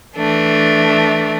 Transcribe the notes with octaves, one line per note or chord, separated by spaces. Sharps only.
E3 A3 D4